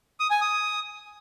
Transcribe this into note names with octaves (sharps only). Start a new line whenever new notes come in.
D#6
G#5
D#6